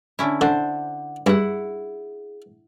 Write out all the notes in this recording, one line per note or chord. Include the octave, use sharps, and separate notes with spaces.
D3 C#4 E4
D3 D4 C5 F#5
G2 E4 G#4 F#5